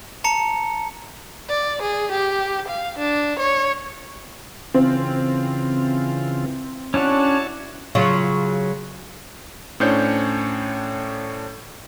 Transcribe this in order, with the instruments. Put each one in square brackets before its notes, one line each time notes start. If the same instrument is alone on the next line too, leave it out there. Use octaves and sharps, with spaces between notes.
[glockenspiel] A5 A#5 C#7
[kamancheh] D5
G#4
G4
F5
D4
C#5
[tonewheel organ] C#3 E3 F4 [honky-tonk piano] C4
[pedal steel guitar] C#4 D4 F#4 [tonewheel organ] E4 C#5 A5
[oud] C#3 F#3 F4
[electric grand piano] A2 C#4 D4 C5 C#5 G6